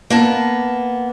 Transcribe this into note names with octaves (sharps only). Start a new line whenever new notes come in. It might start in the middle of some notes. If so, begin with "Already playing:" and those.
A#3 B3 A5